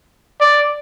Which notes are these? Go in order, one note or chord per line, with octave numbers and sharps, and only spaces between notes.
D5